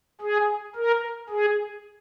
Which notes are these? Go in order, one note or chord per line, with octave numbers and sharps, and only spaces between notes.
G#4
A#4
G#4